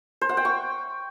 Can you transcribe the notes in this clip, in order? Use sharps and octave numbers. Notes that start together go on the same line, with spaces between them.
C5
F#5
G5
C#6